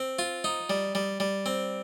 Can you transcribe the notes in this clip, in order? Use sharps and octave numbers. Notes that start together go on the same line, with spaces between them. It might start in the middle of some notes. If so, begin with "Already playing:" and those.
Already playing: C4
F4
D#4
G3
G3
G3
C4